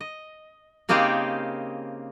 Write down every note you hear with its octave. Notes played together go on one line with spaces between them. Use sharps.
D#5
C#3 A#3 C4 D#4 G4 G#4